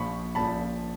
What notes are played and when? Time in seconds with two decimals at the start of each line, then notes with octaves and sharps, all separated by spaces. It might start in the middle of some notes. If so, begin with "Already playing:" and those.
Already playing: A#1 A#2 F3 B5 C#6
0.35 A#1 A#2 F3 A5 B5